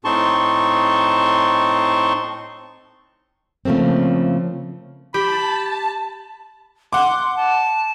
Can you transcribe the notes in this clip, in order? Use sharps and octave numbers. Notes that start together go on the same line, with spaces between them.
A2 C4 D#4 A5 C6 C#6
C#3 F3 A3 A#3 C4
G4 A5 B5
F#5 C6 D6
A5